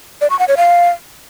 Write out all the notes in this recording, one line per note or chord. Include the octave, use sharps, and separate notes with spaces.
D5
C#6
F#5
C#5
F5